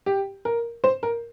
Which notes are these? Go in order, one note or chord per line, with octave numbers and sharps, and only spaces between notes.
G4
A#4
C5
A#4